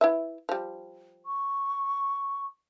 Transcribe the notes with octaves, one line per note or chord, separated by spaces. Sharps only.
E4 B4 E5
F3 G3
C#6